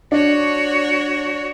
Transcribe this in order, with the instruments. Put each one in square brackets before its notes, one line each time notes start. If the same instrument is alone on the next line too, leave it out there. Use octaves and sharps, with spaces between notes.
[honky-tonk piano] D4 [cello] F#4 C#5